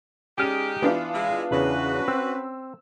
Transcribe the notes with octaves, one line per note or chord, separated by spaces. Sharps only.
G#3 C#4 D#4 G4 G#4 D5 F6 D#7
E3 B3 D4 F4
G#3 E4 F5
E2 C#3 E3 C#4 F#4 B4
C4 E6